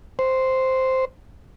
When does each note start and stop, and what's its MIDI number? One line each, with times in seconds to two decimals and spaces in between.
0.19 1.05 72